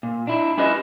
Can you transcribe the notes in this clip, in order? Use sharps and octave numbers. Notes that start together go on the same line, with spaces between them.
A#2
D4 E4
C#4 E4 G4 B4 D#5 E5